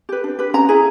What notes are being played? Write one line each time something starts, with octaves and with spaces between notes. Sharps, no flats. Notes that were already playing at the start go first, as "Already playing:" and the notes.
G4 B4
D4
G4 B4
C#4 A#5
E4 G#4